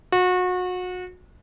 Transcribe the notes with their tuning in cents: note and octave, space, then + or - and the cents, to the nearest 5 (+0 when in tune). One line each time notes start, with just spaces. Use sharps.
F#4 -30